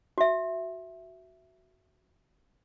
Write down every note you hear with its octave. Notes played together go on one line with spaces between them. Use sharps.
F#4 E5